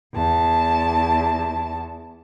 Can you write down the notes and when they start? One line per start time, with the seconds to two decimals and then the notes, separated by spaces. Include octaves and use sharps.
0.14 E2 A5